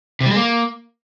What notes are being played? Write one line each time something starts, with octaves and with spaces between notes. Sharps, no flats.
C3
G3
G#3
A#3